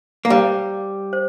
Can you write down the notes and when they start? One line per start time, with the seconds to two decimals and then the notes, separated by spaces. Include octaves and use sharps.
0.25 A#3
0.30 G3 C5 F5 A#5
1.13 C5